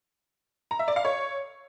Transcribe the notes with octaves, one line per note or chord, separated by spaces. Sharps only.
A#5
E5
D5
F5
C#5